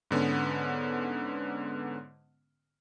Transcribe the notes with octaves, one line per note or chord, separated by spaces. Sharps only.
G#2 D3 B3 C#4